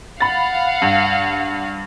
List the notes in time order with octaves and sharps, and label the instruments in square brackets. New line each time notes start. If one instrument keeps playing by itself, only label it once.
[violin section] F5 F#5 [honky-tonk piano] B5 A6
[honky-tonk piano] G2